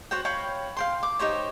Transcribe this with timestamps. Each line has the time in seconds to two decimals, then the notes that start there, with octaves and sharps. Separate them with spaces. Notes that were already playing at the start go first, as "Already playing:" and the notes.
0.11 F#4 C5 C#5 G5
0.25 C#5 F5 G5 B5
0.77 F5 G5 C6
1.03 D6
1.19 D#4 G4 C5 C#5